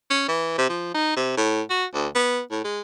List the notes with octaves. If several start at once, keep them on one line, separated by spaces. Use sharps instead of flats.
C#4
E3
C3
F3
D#4
C3
A2
F#4
D2
B3
A2
G#3